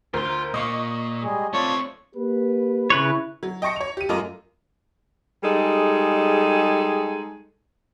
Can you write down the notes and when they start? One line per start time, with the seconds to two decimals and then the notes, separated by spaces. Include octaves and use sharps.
0.14 D2 F4 A#4 C5 C6
0.54 A#2 A#3 D#5 C#6
1.24 G3 G#3 G#4
1.53 A3 C4 F4 C#5 D5 A5
2.15 A#3 G4 B4
2.90 C#3 E4 B4 C#5
3.43 F#3
3.62 D#5 G5 A5 C#6 A#6 C#7
3.76 C#5 F7
3.97 G4 D#7
4.09 F#2 A3 F4 A#4 D#5 D6
5.43 G3 G#3 D#4 G#4 A4